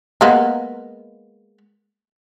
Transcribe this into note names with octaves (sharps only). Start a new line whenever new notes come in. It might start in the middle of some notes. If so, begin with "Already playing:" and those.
G#3 A#3 B3